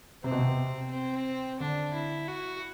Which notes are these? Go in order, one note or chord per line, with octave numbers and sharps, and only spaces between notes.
C3 C4
B2
C3
C4
D3 D4
E4
F#4